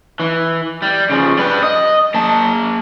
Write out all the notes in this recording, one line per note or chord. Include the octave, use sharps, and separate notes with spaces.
E3
G3
C#3 F3
G3 B4
D#5
A#3 A5